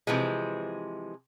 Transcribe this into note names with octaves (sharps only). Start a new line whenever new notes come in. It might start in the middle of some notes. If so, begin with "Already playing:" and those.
C3 E3 F3 G#3